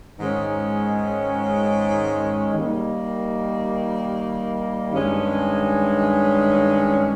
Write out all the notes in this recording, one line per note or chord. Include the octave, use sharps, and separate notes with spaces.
G#2 D#3 G#3 C#4
D#3 G3 A#3
G2 D#3 G#3 C#4